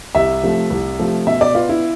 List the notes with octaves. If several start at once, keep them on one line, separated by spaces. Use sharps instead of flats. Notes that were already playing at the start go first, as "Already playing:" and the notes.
C2 E5
C3 F3 A3
C2
C3 F3 A3
B2 E5
D5
B3 F4
E4